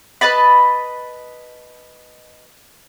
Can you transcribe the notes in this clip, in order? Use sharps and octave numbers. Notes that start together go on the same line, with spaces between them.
B4 D#5 A5 B5